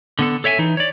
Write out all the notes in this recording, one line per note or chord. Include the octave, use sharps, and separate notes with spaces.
D3 B3 A4
A4 C#5 E5 G5 G#5
E3 D#4
C#5 D5